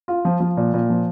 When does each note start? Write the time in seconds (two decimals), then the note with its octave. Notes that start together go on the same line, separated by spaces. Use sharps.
0.08 F4
0.25 F3
0.40 F3
0.57 A#2
0.74 A#2
0.90 F3